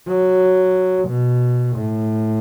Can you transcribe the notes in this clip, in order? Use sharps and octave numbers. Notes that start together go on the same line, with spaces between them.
F#3
B2
A2